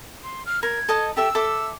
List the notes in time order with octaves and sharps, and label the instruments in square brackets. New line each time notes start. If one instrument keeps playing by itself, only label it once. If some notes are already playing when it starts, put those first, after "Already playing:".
[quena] C6
F6
[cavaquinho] A#4 [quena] G#6
[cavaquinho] A4 D#5 A5
[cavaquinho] G4 A4 E5 [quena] E6
[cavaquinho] A4 E5 D6